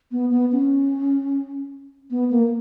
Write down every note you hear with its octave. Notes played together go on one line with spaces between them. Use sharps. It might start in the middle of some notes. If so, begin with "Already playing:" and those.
B3
B3
C#4
B3
A#3